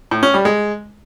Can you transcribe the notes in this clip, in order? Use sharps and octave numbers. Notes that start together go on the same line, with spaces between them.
A2
C#4
G3
G#3